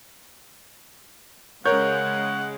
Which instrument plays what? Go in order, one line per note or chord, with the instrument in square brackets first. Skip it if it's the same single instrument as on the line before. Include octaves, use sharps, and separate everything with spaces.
[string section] C#3 G#3 [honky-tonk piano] A#4 G6 [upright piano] C#5 [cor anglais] F#5